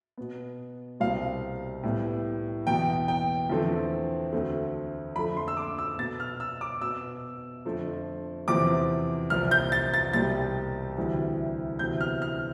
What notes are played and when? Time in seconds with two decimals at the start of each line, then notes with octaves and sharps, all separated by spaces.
0.17 B2 B3
1.00 C2 B2 G3 C4 F5
1.83 A2 G3 B3
2.67 E2 B2 B3 G5
3.08 G5
3.50 E2 D3 F3 A3 C4
4.32 D2 D3 A3 C4
5.16 F2 D3 F3 A3 B5
5.37 C6
5.48 E6
5.57 D6
5.78 E6
5.99 B2 B3 A6
6.20 F6
6.40 E6
6.61 D6
6.81 B2 B3 E6
7.65 F2 D3 F3 A3
8.48 E2 C3 F3 C4 D6
9.30 C2 C3 F3 F6
9.51 G6
9.72 A6
9.94 A6
10.13 C2 B2 G3 C4 A6
10.97 D2 C3 E3 G3
11.79 D2 C3 E3 B3 G6
12.01 F6
12.22 F6